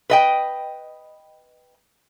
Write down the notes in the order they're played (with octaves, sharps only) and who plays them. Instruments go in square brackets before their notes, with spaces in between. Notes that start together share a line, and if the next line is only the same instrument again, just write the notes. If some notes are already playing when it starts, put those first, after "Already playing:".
[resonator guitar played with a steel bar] B4 D#5 G5